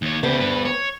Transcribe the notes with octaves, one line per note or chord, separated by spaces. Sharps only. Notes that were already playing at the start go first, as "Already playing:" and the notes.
D#2 C#5
D2 C#3 B3 G4
G2 B4
C#5